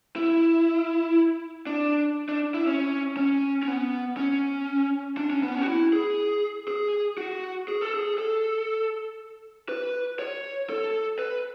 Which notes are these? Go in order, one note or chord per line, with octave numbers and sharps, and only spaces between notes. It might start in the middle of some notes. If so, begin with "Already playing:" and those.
E4
D4
D4
E4
C#4
C#4
C#4
B3
C#4
D4
C#4
B3
C#4
F#4
E4
G#4
G#4
F#4
G#4
A4
G#4
A4
B4
C#5
A4
B4